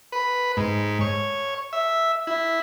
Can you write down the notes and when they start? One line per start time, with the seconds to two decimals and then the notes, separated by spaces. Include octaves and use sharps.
0.12 B4
0.57 G#2
1.01 C#5
1.73 E5
2.27 E4